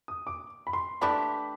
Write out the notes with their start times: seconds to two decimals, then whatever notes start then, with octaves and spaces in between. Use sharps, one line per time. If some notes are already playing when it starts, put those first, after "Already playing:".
0.08 D#6
0.27 D6
0.67 B5
0.73 C6
1.01 E3 A3 D4 G4 B5